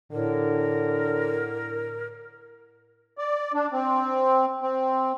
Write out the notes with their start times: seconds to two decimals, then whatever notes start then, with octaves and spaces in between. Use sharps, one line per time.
0.12 A2 D3 A#4
3.18 D5
3.54 D4
3.73 C4
4.62 C4